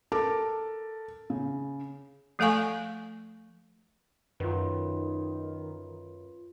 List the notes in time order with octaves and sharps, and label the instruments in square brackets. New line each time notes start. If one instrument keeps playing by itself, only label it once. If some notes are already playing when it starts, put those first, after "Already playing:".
[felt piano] A4 A#4 A5 D6
C#3
[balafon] F3 A3 A4 F5 G#5 C#6
[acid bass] F#2 [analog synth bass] D#3 [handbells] F4 B4